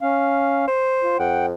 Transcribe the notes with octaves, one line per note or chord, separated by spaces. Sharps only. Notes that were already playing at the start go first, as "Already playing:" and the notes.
C#4 F5
C5
F4
F2 F#5 G5